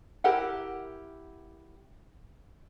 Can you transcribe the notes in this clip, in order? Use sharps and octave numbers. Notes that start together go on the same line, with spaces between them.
E4 G4 A#4 F#5